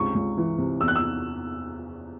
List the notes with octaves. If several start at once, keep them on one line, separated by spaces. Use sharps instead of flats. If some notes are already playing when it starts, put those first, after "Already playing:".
Already playing: C#2 C3 C#6
C#2
E3
C3
E2 E6
F#6
E6